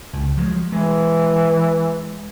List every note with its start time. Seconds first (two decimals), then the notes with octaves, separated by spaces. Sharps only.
0.13 C#2
0.37 F3 F#3 G#3
0.72 E3 G#3